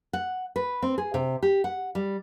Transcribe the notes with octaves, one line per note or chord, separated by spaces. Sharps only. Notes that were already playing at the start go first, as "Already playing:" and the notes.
F#5
B4
C4
G#4
C3
G4
F#5
G3